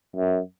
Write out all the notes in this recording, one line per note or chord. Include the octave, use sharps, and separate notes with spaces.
F#2